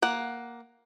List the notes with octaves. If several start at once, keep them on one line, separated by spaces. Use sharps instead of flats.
A#3 F#5